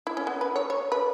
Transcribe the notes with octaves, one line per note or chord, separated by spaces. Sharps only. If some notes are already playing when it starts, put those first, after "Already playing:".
E4
C#4
B3
B4
C#5
C#5
B4